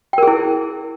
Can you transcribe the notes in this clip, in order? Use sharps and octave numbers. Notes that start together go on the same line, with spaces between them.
E4 G#4 A#4 G5